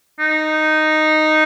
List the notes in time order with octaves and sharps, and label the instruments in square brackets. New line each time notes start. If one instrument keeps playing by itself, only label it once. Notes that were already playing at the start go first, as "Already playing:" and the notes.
[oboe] D#4